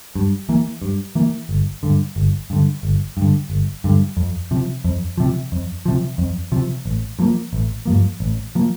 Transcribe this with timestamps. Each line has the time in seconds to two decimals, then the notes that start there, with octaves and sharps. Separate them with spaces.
0.15 G2
0.49 E3 A#3
0.82 G2
1.15 E3 A#3
1.49 G1
1.83 G2 D3
2.16 G1
2.50 G2 D3
2.83 G1
3.17 G2 D3
3.50 G1
3.84 G2 D3
4.17 F2
4.51 C3 F3
4.85 F2
5.18 C3 F3
5.52 F2
5.86 C3 F3
6.18 F2
6.52 C3 F3
6.86 A1
7.19 G2 F3 A#3
7.53 A1
7.86 G2 F3 A#3
8.20 A1
8.55 F3 A#3